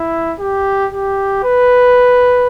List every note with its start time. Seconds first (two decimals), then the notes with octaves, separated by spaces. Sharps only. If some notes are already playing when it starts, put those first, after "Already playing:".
Already playing: E4
0.40 G4
0.92 G4
1.44 B4